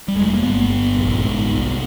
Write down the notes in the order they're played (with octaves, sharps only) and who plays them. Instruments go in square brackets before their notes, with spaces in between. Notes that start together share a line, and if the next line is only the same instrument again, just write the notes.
[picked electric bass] G3
F1 G#3
A3
A#3
G1 B3
G1
A#1
G#2
C2